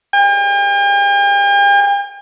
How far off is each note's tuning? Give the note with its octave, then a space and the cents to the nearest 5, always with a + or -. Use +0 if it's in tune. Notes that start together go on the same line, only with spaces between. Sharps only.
G5 +45